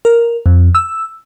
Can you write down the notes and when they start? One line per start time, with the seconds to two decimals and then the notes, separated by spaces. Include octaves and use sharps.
0.05 A#4
0.46 F2
0.75 E6